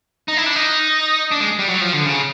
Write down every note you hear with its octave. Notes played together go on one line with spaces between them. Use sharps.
D#4
E4
D4
D#4
D4
G#3
G3
F#3
F3
D3
C#3